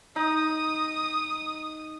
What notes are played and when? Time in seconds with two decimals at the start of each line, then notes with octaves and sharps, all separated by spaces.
0.16 D#4 D#6